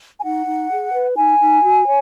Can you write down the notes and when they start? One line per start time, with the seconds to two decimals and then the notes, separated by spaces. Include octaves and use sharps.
0.18 G#5
0.23 D#4 F#5
0.46 D#4
0.70 G#4
0.93 B4
1.16 D#4 G#5
1.39 D#4
1.63 F#4
1.86 C#5